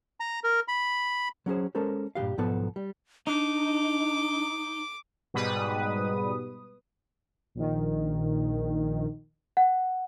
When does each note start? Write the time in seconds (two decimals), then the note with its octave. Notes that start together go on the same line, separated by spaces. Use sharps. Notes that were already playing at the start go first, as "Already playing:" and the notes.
0.20 A#5
0.44 A#4
0.68 B5
1.46 F#3 C#4 G#4 C5
1.75 G#3 C#4 A4 A#4 C5
2.15 G2 A#2 D#3 G4 F5
2.37 B1 G#2 F3 B3 A4 A5
2.76 G3
3.27 D4 D#4 D6
5.34 G#2 B2 G3 B4 D#6
7.55 A#1 D#3
9.57 F#5